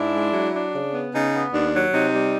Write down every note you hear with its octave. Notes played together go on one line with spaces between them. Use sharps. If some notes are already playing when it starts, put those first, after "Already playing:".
Already playing: G#2 D4 E4
G#3
F#3
D4
C#3
B3
C#3 D#4
B3
D#2 D4
F#3
C3 D#4
G3